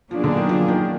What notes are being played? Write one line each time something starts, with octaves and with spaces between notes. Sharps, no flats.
B2 F3 F#3 A#3 D4 G#4
D3
D#3
F3
D#3